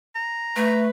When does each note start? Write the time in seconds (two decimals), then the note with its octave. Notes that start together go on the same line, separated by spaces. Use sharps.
0.15 A#5
0.56 A3 B4